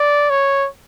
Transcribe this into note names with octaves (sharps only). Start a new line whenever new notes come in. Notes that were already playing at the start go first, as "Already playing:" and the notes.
Already playing: D5
C#5